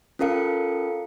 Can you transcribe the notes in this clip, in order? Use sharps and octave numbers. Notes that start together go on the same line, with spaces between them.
C#4 F4 A4 A#4 F5 C#7